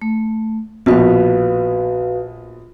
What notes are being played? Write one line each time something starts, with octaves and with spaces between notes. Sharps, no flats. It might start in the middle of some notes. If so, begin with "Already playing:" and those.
A3
A#1 B2 F#4 B4 F5